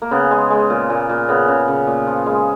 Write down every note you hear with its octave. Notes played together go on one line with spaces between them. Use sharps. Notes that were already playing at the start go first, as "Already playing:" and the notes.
A#3
C#3 B3
G#3
G#3
A#2
A#2
A#2
C#3 B3
C#3
C#3
A#2
F3
G#3